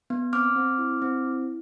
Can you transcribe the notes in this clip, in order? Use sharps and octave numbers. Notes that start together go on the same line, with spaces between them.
B3
C4 D6 F6
C4
E4
C4
E4